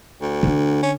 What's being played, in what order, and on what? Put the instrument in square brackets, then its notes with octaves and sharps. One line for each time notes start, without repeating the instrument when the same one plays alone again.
[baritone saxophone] D2
[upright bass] D3 D4
[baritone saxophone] C#4